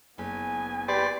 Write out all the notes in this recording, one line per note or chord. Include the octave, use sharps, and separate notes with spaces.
F#1 B3 G#5
G4 B4 D5 C6